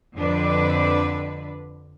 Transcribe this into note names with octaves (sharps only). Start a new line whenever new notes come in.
F2 D3 D4 B4